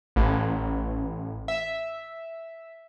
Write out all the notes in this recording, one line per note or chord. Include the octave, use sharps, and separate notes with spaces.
A1
E5